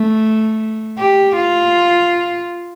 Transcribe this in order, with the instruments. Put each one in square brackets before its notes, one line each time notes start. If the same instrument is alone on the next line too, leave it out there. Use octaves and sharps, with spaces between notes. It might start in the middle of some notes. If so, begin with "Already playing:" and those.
Already playing: [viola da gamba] A3
G4
F4